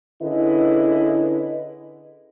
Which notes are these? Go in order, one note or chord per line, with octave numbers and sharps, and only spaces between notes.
D3 C#4 E4 G#4 B4 D#5